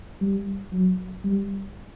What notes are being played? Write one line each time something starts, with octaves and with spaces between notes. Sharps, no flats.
G3
F#3
G3